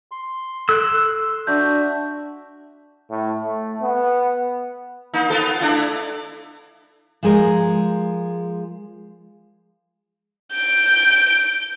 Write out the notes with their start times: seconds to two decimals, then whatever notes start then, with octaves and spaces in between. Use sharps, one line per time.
0.11 C6
0.69 A4 E6 F#6
1.47 D4 F#4 D5 E5 A5 G6
3.10 A2
3.44 A3
3.82 B3
5.14 A#3 D#4
5.30 B3 F4 A4
5.61 A3 D4 E4
7.23 F3 G#3 G#4 A#4
10.54 G6 D7